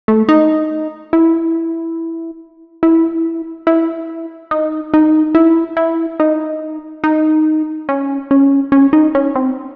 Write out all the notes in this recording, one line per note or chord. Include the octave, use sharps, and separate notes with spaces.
A3
D#4
E4
E4
E4
D#4
D#4
E4
E4
D#4
D#4
C#4
C#4
C#4
D#4
C#4
C4